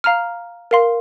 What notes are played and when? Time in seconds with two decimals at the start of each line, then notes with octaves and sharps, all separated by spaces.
0.04 F5 A#5 F6
0.71 A#4 F5 C6